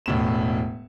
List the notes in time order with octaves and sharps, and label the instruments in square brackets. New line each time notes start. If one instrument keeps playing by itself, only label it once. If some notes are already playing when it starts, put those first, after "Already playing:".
[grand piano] E1 A2 E7